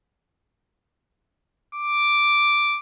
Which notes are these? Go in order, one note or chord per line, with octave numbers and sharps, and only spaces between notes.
D6